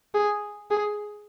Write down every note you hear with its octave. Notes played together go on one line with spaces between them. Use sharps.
G#4
G#4